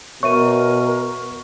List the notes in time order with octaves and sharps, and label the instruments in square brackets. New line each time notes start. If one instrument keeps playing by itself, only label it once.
[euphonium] B2 [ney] A#4 [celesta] C#5 E5 D#7 [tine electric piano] C#6